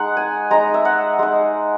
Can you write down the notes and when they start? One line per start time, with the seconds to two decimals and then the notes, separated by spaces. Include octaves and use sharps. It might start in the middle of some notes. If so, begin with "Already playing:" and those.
Already playing: G#3 D#4 F#5
0.17 G#5
0.51 G#3 D#4 A#5
0.74 E5
0.85 F#5
1.19 G#3 D#4